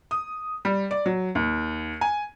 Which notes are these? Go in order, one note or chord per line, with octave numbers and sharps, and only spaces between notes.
D#6
G3
D5
F#3
D#2
G#5